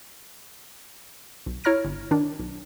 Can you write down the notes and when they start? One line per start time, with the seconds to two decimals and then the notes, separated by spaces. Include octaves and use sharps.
1.46 B1
1.64 E4 C#5 A#5 F6 A#6 D7
1.85 G1
2.11 D#3 D4
2.39 B1